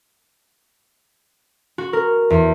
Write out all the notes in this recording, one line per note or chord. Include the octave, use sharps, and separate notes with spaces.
F#4
A#4
E2